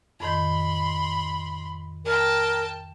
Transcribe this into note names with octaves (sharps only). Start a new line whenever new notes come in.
F2 A2 D#3 B5 C6
A#4 G5 A5